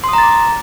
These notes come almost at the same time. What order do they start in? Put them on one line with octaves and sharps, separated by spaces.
C6 D#6 A#5 A6 D6